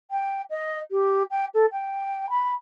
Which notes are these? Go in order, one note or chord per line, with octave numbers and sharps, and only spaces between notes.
G5
D#5
G4
G5
A4
G5
B5